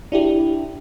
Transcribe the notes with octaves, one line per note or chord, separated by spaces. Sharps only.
D4 E4 G4